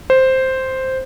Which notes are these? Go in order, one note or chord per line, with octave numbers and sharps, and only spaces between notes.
C5